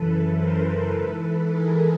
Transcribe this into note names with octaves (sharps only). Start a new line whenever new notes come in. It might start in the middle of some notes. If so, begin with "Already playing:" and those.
Already playing: F#2 C#3 E3 A4 B4
A#4 C5
G#2 E3 A4 B4
G#4 A#4